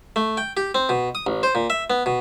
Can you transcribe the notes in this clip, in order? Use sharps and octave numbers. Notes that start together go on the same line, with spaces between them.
A3
G5
G4
C4
B2
D#6
A1
C5
A#2
E5
B3
B2